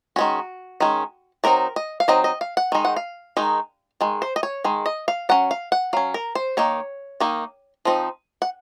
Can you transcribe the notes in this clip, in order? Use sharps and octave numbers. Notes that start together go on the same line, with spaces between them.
D#3 G#3 C#4 F#4
D#3 G#3 C#4
F#3 C4 D#4 A#4
D#5
F5
F#3 C4 D#4 D#5
D#5
F5
F#5
D#3 G#3 D#4
F#5
F5
D#3 G#3 D#4
D#3 G#3
C5
D#5
C#5
D#3 G#3
D#5
F5
F#3 C#4 F#5
F5
F#5
F#3 C#4 F5
A#4
C5
D#3 A#3 D#4 C#5
D#3 A#3 D#4
F3 C4 D#4
F#5